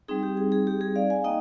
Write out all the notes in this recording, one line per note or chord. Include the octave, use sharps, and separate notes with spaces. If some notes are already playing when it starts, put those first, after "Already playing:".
G3 C4 D#4 G#4
G4
G#4
G#4
G4
G#4
D5 F5
F5 G#5
A#3 D#4 D#5 G5